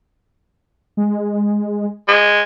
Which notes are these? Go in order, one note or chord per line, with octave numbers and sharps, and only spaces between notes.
G#3
G#3